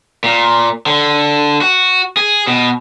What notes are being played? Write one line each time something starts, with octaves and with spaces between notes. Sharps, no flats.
A#2
D3
F#4
G#4
B2